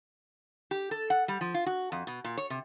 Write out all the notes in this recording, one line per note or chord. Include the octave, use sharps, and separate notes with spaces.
G4
A4
F#5
G3
F3
F4
F#4
F2
B2
A#2
C#5
C3